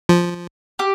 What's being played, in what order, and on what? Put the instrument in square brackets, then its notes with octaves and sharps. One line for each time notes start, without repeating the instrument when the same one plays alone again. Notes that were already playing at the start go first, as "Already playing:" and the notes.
[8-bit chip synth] F3
[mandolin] G4